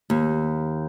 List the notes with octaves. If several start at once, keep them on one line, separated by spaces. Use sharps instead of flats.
D#2